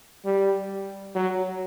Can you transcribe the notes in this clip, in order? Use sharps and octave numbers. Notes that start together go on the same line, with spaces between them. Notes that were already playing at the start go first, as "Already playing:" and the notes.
G3
F#3